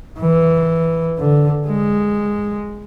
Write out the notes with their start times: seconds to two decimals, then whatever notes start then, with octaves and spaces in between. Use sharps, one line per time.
0.20 E3
1.19 D3
1.69 G#3